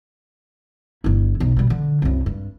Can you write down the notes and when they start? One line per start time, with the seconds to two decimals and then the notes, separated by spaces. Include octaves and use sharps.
1.04 G1 E4
1.40 B1
1.57 B2 G3
1.70 D3
2.02 C2 F#2
2.26 G2